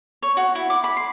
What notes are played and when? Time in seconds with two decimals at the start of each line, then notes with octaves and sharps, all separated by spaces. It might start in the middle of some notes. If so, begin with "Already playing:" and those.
0.22 C#5
0.37 F#4
0.55 E4
0.70 D6
0.84 B5
0.96 C6